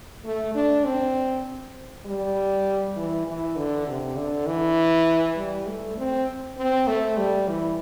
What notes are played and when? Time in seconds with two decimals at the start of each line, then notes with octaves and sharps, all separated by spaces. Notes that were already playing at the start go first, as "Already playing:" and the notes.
0.24 A3
0.55 D4
0.86 C4
2.06 G3
2.96 E3
3.26 E3
3.56 D3
3.87 C3
4.16 D3
4.47 E3
5.37 G3
5.67 A3
5.98 C4
6.58 C4
6.88 A3
7.17 G3
7.48 E3